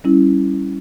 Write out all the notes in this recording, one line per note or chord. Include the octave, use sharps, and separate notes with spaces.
G3 C#4 E4